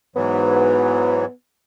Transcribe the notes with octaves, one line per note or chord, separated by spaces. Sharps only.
G#2 E3 F#3 B3